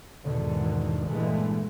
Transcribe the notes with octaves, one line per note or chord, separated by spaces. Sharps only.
E2 G#2 B2 D3 D#3
G2 A#2 D3 E3 G#3 A3